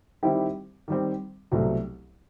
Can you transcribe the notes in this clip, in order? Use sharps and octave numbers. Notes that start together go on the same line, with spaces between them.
D#3 G3 C4 E4 G4
D#3 G3 C4
C2 B2 F#3 A3 C4